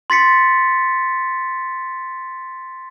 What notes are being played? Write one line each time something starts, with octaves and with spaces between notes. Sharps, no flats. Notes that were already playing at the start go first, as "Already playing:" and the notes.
C6 A6 B6 C#7